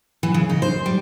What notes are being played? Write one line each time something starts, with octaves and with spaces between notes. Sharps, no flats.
E3
C#3
D#4
C5
G3